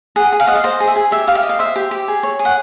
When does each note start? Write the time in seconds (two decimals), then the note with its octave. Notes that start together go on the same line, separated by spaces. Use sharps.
0.16 G#4 F#5
0.32 G#4
0.40 F5
0.47 D#5 F#5
0.55 F5
0.64 C5 D#5
0.80 G#4
0.88 E5
0.96 G#4
1.11 G4 E5
1.27 G4 F5
1.35 E5
1.43 D#5
1.49 F5
1.59 C5 E5
1.76 G4
1.91 G4
2.08 G#4
2.23 C#5
2.39 G#4
2.45 F#5